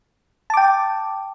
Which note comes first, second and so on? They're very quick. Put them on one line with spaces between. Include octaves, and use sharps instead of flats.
A5 D6 G5